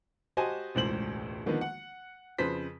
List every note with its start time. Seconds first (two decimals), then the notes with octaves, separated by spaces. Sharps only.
0.37 F#4 G4 C5 D#5 G#5 A5
0.75 E1 C#2 A2 C5 F#7
1.46 D3 D#3 F3 A#3 B3
1.61 F#5
2.39 F2 C#3 B4 C5 B6